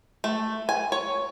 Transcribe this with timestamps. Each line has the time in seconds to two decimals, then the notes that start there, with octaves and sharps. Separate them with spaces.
0.24 A3
0.69 G#5
0.92 C#5